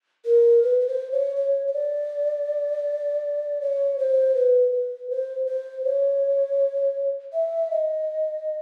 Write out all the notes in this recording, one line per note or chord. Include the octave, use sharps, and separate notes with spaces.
A#4
B4
B4
C5
C#5
C#5
C#5
D5
C#5
C5
B4
B4
C5
C5
C#5
E5
D#5